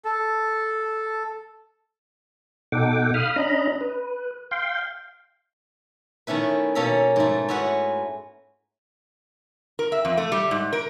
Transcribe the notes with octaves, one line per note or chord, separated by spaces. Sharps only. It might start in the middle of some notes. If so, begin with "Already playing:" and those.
A4
B2 D#4 A4 F#5 G5 D6
F5 B5 D#6 F6
C#4 D4 D#5 A#5 B5
B4
F5 G5 C6
D#3 A3 C#4 E4 B4
B2 A#3 C#4 A4 A#5 B5
G#2 A3
C#4 E4 F#4 B4 F#5
A#4
E5
F2
A3
G3
G#2
A#4